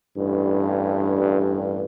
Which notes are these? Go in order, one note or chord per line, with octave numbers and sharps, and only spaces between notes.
A1 G2